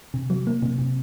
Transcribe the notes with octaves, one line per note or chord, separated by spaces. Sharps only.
C3
F#3
A#3
C3
C3